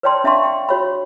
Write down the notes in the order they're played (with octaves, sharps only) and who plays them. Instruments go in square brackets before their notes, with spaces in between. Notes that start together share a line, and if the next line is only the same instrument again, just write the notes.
[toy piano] B4 C#5 D5 G5 A5 C6
D4 E5 F5 A5 C6 C#6
G5 C6
F#4 C#5 B5